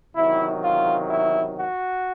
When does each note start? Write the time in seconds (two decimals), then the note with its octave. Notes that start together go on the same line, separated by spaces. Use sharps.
0.15 E2 C3 D#3 F#3 E4
0.62 F4
1.08 E4
1.56 F#4